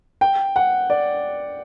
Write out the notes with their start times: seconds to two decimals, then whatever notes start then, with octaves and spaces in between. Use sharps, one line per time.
0.21 G5
0.56 F#5
0.90 D5